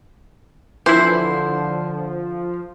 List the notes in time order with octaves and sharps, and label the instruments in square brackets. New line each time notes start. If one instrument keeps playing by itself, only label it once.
[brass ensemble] D3 [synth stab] E3 E4 [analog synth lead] F3 [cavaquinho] C5